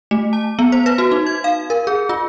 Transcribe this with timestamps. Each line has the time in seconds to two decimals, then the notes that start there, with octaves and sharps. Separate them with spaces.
0.11 A3
0.33 A5
0.59 B3
0.72 C5
0.86 B4
0.98 F#4
1.12 D#4
1.27 G#6
1.44 F5
1.70 A#4
1.87 G#4
2.09 F4